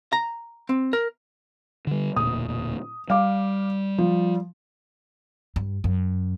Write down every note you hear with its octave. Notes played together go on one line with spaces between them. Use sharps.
A#5
C4
A#4
D3 G3
E1 D2 A#2 D#6
G3 F5 D6
F3
G2
F#2